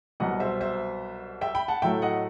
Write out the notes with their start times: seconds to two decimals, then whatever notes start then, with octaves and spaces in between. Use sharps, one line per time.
0.20 C2 B2 F#3 D#5 F#5
0.40 C5 E5
0.61 C5 E5
1.41 E5 G5
1.55 G5 B5
1.68 F#5 A5
1.82 A2 F#3 A3 E5 G5
2.02 D#5 F#5